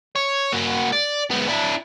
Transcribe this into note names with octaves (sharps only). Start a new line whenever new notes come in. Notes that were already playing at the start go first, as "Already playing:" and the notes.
C#5
A#3 F#4
D5
G#2 B3
D4 E4